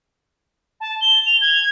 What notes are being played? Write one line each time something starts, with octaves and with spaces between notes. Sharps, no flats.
A5
G7
F7
G#6